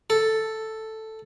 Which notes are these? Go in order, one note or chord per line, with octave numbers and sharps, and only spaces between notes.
A4